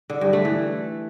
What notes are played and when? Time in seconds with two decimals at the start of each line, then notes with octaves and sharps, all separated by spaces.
0.10 D3
0.21 G2
0.33 A3
0.45 E3